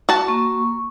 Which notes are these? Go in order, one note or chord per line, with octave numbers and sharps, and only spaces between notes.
F#4 A5
A#3 C#6